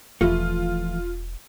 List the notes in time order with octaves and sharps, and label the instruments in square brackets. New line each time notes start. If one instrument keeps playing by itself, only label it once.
[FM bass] E1 [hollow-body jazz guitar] E3 F3 A3 [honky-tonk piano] F4